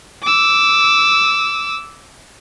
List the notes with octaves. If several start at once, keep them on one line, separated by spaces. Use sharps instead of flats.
D6 E6